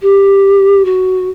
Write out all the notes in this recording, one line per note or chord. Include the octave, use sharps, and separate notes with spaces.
G4
F#4